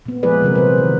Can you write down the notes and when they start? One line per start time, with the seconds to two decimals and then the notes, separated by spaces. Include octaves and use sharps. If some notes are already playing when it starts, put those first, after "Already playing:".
0.06 A#2 B3
0.23 F3 G#3 E4 G#4 B4 D5
0.42 C3 E3 F#3 A#4
0.55 B4 C5
0.78 D#3